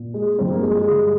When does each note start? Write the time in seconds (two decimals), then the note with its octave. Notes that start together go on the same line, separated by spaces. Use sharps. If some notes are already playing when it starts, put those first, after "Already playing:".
Already playing: A#2
0.14 G#3
0.39 G2 F3 G#3 C4
0.51 A#3
0.62 G#3
0.75 G#3
0.86 G2 D3 G3